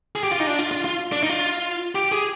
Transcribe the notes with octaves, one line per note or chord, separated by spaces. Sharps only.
G#4
G4
F4
D#4
D4
F4
F4
F4
D4
D#4
F4
G4
G#4